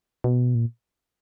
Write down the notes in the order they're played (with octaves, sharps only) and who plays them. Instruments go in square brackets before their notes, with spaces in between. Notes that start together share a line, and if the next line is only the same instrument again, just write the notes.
[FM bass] B2
A#2